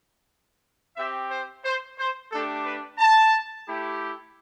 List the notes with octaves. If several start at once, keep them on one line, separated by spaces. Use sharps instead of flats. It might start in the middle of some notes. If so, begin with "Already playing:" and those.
C4 G4 E5
C5
C5
C5
A3 D4 G4 A4
B4
A5
A3 E4 G4